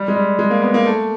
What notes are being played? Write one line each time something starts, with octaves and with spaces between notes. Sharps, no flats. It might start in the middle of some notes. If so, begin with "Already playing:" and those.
Already playing: G3
G#3
G3
G#3
A#3
B3
A#3
A3